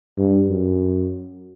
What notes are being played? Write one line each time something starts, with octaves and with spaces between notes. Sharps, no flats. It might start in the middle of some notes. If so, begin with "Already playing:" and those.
G2
F#2